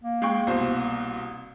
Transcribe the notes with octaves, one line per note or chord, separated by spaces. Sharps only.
A#3
G#3 G5 C#6
C2 B2 C5